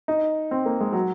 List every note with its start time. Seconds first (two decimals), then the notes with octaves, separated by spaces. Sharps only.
0.08 D#4
0.51 C4
0.66 A#3
0.80 G#3
0.93 F#3